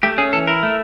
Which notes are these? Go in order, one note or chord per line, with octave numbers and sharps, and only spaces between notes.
A3 G4
C#4 G#4
E3 A4
E4 A#4
A3